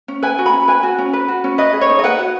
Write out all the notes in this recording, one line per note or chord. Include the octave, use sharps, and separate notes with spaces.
C#4
B4 G#5
F#4
B5
C#4
B4 G#5
F#4
C#4
B4
F#4
C#4
B4 D#5
G#4
C#5
D#4
D#5
B4 F#5
F#4